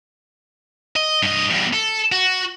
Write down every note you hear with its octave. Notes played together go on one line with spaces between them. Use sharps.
D#5
G2 D#5
E2 G2
A4
F#4